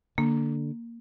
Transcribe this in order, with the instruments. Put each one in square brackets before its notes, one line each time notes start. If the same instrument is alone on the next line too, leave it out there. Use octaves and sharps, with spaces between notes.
[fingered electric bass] D3 [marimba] A#3